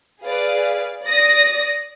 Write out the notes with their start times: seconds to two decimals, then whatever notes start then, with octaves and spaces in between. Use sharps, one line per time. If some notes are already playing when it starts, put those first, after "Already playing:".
0.22 G#4 B4 D5 F5
1.05 D5 D#6 A#6